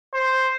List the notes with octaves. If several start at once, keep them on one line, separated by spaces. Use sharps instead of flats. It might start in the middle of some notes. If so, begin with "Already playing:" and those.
C5